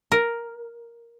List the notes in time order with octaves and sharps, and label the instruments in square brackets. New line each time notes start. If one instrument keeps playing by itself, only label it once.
[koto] A#4